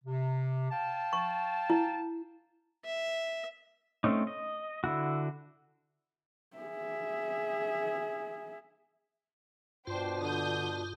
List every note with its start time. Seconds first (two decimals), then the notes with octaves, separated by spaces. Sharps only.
0.04 C3
0.70 F5 G5 A5
1.13 C#6
1.70 E4
2.85 E5
4.04 A3 C4 C#4 D#4
4.27 D#5
4.84 D3 E4 F#4
6.57 G#4 E5
9.87 G2 B2 D4 F4 C5 G5
10.21 D3 D#6 G6